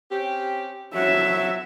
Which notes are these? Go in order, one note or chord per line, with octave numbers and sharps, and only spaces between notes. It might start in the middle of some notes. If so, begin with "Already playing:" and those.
C4 C#4 G4
F#2 F3 F#3 E5